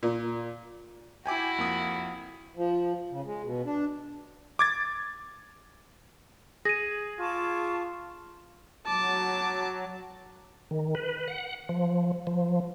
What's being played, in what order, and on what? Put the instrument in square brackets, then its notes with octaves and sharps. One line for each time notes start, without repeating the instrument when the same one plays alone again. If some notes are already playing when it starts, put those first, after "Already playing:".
[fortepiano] A#2
[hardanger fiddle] E4 F#4 [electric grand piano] G5 G#5 D6
[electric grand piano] F2 A#3 D#6
[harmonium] F3
C#3
G#3
B2
D4
[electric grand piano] D6 G#6 A6
[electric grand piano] G#4 [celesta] A#6 D#7
[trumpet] F4 [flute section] A5 C#6 D6
[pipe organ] F#3 [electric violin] A5 D6
[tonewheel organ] D#3
B4
F#5
F3
F3